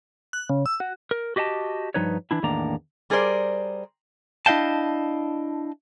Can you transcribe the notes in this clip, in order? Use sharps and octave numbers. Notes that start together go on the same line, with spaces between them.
F#6
C#3
E6
F#4
A#4
F#4 G4 D#5 F5 A5
G2 F3 D#4 B4 C#5
E3 D4 E4
E2 A2 D#3 A#3 D4 A#5
G3 G#4 A#4 C5 D5
D4 E4 D#5 F5 G5 A5